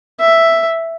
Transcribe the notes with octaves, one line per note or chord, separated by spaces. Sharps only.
E5